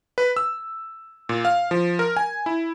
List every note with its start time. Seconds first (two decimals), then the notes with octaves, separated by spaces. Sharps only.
0.18 B4
0.36 E6
1.29 A#2
1.45 F5
1.71 F3
1.99 A#4
2.17 G#5
2.46 E4